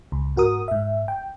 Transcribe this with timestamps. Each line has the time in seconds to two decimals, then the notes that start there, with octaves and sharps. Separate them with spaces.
0.12 C#2
0.36 G#2 F#4 A#4 D#6
0.68 G#2 E5
1.08 G5